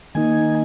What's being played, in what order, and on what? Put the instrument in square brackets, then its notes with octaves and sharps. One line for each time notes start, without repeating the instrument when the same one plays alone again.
[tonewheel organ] D#3 A#3 D#4 G#5